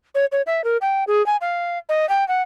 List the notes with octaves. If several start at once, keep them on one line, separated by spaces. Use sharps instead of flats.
C#5
C#5
E5
A#4
G5
G#4
G#5
F5
D#5
G5
F#5